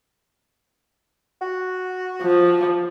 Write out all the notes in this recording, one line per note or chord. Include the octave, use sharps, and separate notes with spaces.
F#4
F3